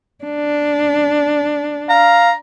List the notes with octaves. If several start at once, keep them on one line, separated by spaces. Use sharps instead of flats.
D4
F5 A#5